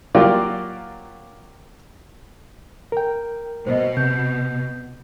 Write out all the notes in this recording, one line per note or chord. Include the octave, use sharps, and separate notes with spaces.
F#3 A#3 F4 G4 D5
A#4 G5
B2 C5 D#5
C3 G6